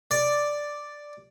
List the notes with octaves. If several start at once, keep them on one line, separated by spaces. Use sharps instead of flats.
D5